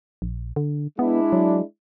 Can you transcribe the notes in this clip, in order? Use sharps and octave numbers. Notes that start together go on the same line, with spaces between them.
A#1
D3
G#3 B3 D4 E4
F#3